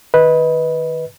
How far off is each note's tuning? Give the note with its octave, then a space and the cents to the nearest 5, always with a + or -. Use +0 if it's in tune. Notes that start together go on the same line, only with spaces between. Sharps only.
D#3 +0 B4 -5 D#5 +25